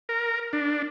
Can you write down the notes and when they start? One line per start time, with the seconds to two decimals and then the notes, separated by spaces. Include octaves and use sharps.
0.09 A#4
0.53 D4